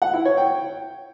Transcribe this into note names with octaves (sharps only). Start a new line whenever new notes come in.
F#5
E4
C#5
G5